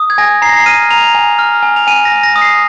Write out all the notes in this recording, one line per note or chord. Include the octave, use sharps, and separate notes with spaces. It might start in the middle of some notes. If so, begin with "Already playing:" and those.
Already playing: D#6
G#6
G#5 A#6
A#5 C7
A#6
C7
F6 D#7
A#5 F7
G#5
F6
G#5
F7
G#5 D#7
A#6
G#5
A#6
D#6
C7